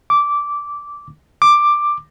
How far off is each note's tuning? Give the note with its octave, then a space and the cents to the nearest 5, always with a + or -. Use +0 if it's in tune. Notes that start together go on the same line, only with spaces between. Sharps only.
D6 -10
D6 +10